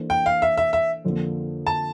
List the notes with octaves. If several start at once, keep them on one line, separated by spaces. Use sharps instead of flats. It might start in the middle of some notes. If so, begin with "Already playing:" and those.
Already playing: E3 A#3 D4 A4 C5
G5
F5
E5
E5
E5
F2 D3 F3 A#3
A5